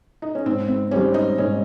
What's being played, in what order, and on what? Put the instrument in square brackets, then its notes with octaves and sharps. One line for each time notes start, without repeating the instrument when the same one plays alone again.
[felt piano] D#4
C#4
[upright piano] G#2 [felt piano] C4
[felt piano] C4
[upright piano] G3 C4 G4 [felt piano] C#4
[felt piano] D#4
[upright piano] G#2 [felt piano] C#4